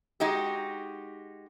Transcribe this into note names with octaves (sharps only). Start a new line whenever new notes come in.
G#3 D#4 F#4 G4